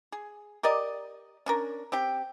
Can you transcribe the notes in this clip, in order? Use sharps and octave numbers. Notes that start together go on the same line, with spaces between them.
G#4
G4 A#4 D5 D#5
C#4 D4 A#4
C4 G4 G5